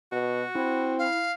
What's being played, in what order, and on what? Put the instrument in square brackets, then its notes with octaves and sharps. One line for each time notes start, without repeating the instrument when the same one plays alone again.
[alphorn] B2 [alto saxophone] F#4
[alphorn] C4 [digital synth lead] E4
[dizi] F5